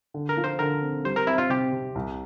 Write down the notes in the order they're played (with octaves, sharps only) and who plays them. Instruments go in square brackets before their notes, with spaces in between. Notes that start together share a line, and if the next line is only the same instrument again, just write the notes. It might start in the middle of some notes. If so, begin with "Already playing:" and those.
[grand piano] D3
[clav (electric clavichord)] A#4
[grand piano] F3
[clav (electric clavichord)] C5
[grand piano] D3 [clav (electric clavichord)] A#4
[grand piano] C4
[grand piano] G3 [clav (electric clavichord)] C5
[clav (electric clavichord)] A#4
[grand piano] C4 [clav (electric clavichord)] E4
[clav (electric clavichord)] F4
[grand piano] C3 [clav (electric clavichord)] G4
[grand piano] C3
C2